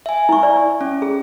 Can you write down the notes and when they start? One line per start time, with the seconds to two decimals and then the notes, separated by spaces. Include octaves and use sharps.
0.06 E5 G#5
0.29 E4 C#6
0.43 D5
0.81 C#4
1.02 G#4